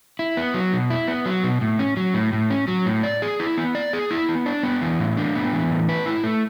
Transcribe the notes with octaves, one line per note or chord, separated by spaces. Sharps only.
E4
B3
F#3
B2
E4
B3
F#3
B2
A2
C#4
F#3
A2
A2
C#4
F#3
A2
D5
G#4
E4
B3
D5
G#4
E4
B3
D4
B3
E3
A2
D4
B3
E3
A2
B4
E4
A3